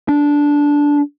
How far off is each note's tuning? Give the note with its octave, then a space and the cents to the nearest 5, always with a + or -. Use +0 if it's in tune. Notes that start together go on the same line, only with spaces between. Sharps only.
D4 -10